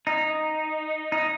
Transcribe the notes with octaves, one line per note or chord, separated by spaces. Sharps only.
D#4
D#4